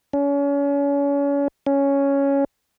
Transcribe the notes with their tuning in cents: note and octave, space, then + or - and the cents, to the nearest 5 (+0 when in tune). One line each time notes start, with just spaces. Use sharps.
C#4 +35
C#4 +5